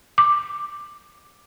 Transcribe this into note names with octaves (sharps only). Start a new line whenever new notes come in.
D6